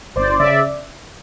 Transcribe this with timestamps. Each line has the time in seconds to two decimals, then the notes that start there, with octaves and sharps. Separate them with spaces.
0.16 G1 C5 D5
0.40 C#3 D5 E5